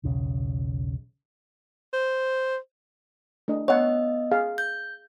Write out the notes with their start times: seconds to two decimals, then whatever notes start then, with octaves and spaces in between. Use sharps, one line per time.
0.03 E1 B1 C#3
1.93 C5
3.48 A3 D4 D#5
3.68 B3 C#5 D#5 F#5
4.31 G#4 F5
4.58 G6